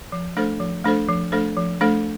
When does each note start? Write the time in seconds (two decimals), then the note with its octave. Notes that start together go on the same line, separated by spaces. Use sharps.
0.12 F3
0.37 A3 D4 A4 C5
0.60 F3
0.84 A3 D4 A4 C5
1.08 F3
1.32 A3 D4 A4 C5
1.57 F3
1.81 A3 D4 A4 C5